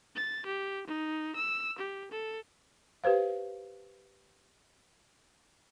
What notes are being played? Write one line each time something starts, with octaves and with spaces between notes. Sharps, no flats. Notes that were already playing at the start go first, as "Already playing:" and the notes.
A6
G4
D#4
E6
G4
A4
G4 B4 C5 F5